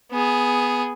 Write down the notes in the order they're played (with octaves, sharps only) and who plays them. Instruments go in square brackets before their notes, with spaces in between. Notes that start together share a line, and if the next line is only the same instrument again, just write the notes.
[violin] B3 G#4